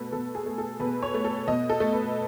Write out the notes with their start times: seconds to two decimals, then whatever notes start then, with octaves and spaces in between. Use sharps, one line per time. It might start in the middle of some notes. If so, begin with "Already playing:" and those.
Already playing: B2 A3 A4 B4
0.12 B2 A4
0.35 G#4
0.46 A3
0.58 A4
0.79 B2 B4
1.03 C#5
1.14 A3
1.24 A4
1.47 B2 D#5
1.70 A4
1.80 A3
1.93 B4